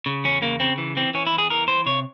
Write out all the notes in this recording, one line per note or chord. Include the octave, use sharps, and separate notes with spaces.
C#3
E2 C#4
C#3 A#3
C#3 C4
E3
E3 C4
E3 C#4
E4
E2
G#4
E3 A#4
E3 C5
C3 C#5